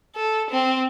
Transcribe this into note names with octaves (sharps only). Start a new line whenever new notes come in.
A4
C4